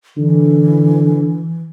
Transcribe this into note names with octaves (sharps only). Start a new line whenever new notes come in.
D3 E3